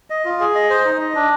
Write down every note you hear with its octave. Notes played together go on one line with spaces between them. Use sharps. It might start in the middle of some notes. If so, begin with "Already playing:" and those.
D#5
F4
G#4
D#5
C5
D#4
D#5
D4